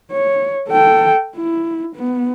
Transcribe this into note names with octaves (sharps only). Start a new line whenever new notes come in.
C#5
A4 G5
E4
B3